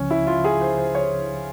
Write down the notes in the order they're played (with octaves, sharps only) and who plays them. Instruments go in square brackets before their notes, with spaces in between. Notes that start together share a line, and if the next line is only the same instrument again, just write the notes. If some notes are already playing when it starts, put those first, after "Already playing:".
Already playing: [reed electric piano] C#2 C#3 F3 [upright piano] C#4
[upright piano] E4
F4
G#4
C5
C5
C#5